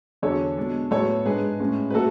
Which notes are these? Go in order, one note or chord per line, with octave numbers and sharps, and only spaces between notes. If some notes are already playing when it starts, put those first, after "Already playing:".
E2 D3 F#3 A4 C#5
B2 G#3 D4
A2 F#3 B3 A4 C#5
G#2 G#3 D4 G#4 B4
A2 G#3 C#4
B4
A3 F#4 A4